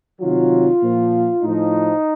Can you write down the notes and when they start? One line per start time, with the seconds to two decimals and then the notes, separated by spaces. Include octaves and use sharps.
0.20 C3 D#3 F#3 F4
0.82 A#2 F3
1.43 A2 F3 D#4